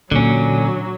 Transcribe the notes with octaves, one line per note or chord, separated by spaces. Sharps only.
A#2 D3 E3 F#3 C#4